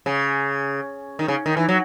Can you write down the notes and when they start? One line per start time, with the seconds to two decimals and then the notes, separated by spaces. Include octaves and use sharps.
0.06 C#3
1.19 D#3
1.28 C#3
1.46 D#3
1.57 E3
1.69 F#3